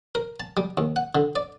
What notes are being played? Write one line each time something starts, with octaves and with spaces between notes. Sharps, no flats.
A#4
A5
G3
D#2
F#5
D3
D5